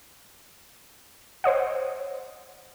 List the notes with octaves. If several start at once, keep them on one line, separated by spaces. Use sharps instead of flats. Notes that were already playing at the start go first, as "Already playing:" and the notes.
C5 C#5 D#5 F#5